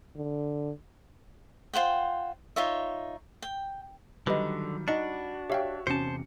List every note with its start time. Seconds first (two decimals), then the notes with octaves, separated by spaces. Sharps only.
0.16 D3
1.73 F4 C5 F#5 G5
2.56 D#4 F4 C#5 E5
3.42 G5
4.27 D3 D#3 F#3 G3 B4 D#5
4.88 D4 D#4 F#4 D#5 C#7
5.50 G4 C#5 E5 F5 G5
5.87 E2 C3 C#4 F#4 C5 A5 C#7